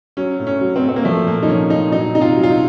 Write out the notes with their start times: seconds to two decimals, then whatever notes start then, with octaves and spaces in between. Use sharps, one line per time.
0.17 F#3 C#4
0.39 A2
0.47 C#4
0.61 F#3
0.76 C4
0.83 A2
0.89 C4
0.96 A#3
1.05 F3 A3
1.27 A#2 A#3
1.43 D#4
1.48 F3 C#4
1.70 A#2 D#4
1.92 F#3 D#4
2.15 C3 D#4
2.21 F4
2.37 F#3
2.43 F4
2.51 D#4